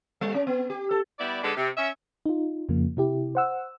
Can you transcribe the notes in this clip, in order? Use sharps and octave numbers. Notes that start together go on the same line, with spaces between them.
G3
C#4
B3
G4
A4
G3 B3 E4 D5
D3 G#3 B3 D4 G4 A4
C3
C#4 E5
D#4 F4
F2 C#3 F3 A#3
C3 E4 G4
C5 F#5 E6